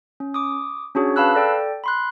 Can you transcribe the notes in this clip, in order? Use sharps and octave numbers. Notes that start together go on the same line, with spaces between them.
C#4
D6 D#6
C#4 D4 F#4 G#4 C#5
B4 F5 A5 B5 E6 F#6
A4 D5 G5
B5 C6 F#6